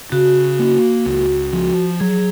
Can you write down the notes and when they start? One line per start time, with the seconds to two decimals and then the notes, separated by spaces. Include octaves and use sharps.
0.12 C#3 F#4
0.59 A#3
1.06 C#2
1.53 F3
2.00 F#3 G#4